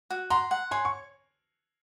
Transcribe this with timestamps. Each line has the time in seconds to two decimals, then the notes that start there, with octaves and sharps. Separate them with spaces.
0.10 F#4
0.30 F#5 A#5 C6
0.51 F#5
0.71 C#5 G#5 C6
0.85 C#6